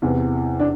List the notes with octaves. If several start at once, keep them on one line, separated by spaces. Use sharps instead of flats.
E2 C3 E3
D4